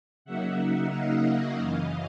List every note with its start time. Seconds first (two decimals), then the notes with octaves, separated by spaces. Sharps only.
0.25 C#3 F#3 A#3 D#4 E5 F#5
0.91 D#5 F5
1.58 F#2 C#3 E3